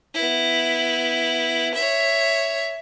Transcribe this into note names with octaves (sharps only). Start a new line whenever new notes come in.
B3 E4
C#5 E5